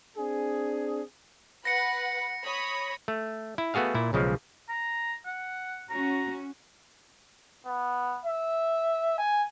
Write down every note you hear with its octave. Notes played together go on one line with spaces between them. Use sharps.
C4 D4 G#4
B4 F#5 B5 A#6 C#7
C#5 B5 D#6
A3
E4
A3 B3 F#4 G#4 F5
A#2 E4
B1 C#3 F3 G#3
A#5
F#5
C#4 F#4 A#5
B3
E5
G#5